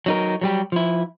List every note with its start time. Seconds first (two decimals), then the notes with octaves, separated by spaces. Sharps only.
0.06 F#3 D#4 A#4
0.41 F#3 G3 G4
0.72 F3 E4